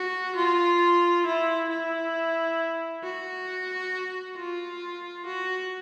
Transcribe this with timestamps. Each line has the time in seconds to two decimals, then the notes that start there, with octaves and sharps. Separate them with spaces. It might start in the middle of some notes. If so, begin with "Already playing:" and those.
Already playing: F#4
0.36 F4
1.26 E4
1.70 E4
3.03 F#4
4.37 F4
5.26 F#4